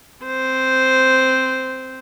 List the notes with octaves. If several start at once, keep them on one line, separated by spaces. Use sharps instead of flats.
C4 C5